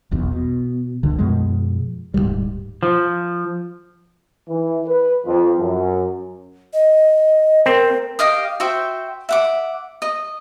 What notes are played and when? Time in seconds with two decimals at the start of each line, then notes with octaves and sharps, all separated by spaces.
0.11 E1 B1 E2
0.32 B2
1.03 C#2 D3
1.18 F#2 B2 F3 G#3
2.14 D1 F2 G#2 G3
2.83 F3
4.49 E3
4.86 B4
5.26 F2
5.59 F#2
6.73 D#5
7.66 C4 A#4
8.19 G4 D#5 F5 D#6
8.60 F#4 C5 E5 G5
9.29 E5 F#5 D6
10.02 D#5